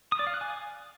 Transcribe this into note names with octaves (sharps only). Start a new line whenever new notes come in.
D#6
D5
F5
F#6
G#5